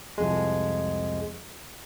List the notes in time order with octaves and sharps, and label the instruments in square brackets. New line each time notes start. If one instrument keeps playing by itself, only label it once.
[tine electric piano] C2 F2 G#3